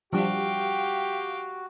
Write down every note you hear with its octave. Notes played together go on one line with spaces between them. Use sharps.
F3 G3 D4 F#4 G4 F5 G5